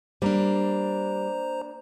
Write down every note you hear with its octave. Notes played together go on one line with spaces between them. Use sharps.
G3 A#3 D4 C5 A#5